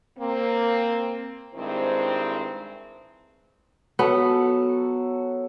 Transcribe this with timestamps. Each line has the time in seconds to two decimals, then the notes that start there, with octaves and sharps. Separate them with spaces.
0.18 A#3 C4
1.55 G2 D#3 G#3 C4 E4 C5
3.99 F#3 B3 A4 A5